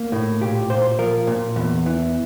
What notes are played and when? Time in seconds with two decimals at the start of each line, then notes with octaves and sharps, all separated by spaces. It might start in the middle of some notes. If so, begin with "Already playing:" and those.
Already playing: A#3
0.12 A2
0.41 A#2 G4
0.70 A#2 C5
0.99 F3 A#4
1.27 A#2
1.56 E2
1.86 E3